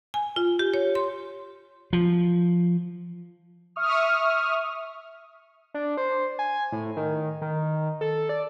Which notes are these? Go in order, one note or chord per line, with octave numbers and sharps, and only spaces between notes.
G#5
F4
G4
C#5
C6
F3
E5 C#6 D#6 F6
D4
C5
G#5
A2
D#3
D#3
A4
D5